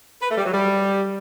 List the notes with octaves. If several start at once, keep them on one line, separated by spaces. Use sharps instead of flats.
B4
A3
G3
F#3
G3